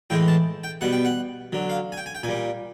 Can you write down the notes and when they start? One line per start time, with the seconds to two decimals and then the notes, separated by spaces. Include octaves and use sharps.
0.10 A2 E3 G#3 G5
0.28 A5
0.64 G5
0.81 B2 G3 F#5
0.92 G5
1.05 F#5
1.53 D3 F#3
1.70 F5
1.92 G#5
1.97 G5
2.06 G#5
2.15 G5
2.23 A#2 G#5
2.29 G3